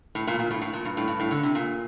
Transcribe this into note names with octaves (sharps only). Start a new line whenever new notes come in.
A2
A#2
A#2
A2
A2
A#2
G2
A2
G2
A2
D3
C3
A#2